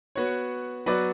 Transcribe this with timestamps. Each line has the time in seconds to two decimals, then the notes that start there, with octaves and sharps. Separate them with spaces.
0.15 B3 F#4 C#5
0.86 F#3 B3 F#4 B4 D5